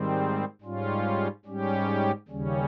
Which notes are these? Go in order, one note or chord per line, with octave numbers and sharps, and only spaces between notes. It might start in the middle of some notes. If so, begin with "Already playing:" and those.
Already playing: G#2 D#3 G3 C4
G#2 G3 C#4 F4
G#2 G3 C#4 G4
D#2 C#3 G3 C#4